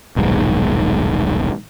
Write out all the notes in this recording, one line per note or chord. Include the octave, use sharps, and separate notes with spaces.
D#1 B1 G#2